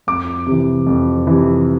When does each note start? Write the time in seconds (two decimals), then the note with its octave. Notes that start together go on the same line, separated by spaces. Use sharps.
0.07 F2 D6
0.47 C3 E3
0.86 F2
1.27 C3 E3